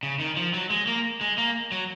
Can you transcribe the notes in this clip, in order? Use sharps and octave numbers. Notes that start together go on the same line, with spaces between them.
C#3
D#3
F3
F#3
G#3
A#3
G#3
A#3
F#3